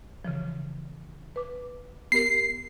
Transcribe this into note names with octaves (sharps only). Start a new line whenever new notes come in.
C#3 E3 F3
B4 D6
B3 G4 A#4 C7